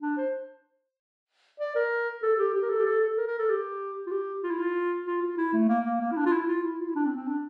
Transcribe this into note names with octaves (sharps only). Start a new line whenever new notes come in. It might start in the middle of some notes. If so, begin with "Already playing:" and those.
D4
C5
D5
A#4
A4
A4
G4
G4
A#4
A4
G4
A4
A4
A#4
A#4
A4
G4
F4
G4
F4
E4
F4
F4
F4
E4
A3
A#3
A#3
A#3
E4
D4
F4
E4
F4
E4
F4
E4
D4
C4
C4
D4